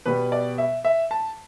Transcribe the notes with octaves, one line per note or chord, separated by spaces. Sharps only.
B2 G3 B3 B4
D5
E5
E5
A5